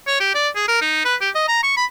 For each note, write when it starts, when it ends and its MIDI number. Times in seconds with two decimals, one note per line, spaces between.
0.07 0.19 73
0.20 0.35 67
0.35 0.48 74
0.56 0.65 68
0.68 0.81 70
0.81 1.02 63
1.05 1.15 71
1.21 1.30 67
1.35 1.45 75
1.48 1.62 82
1.63 1.74 85
1.77 1.85 83